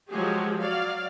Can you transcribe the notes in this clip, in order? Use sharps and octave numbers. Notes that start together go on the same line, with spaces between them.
F3 F#3 G#3 G4 G#4
F#3 D5 F5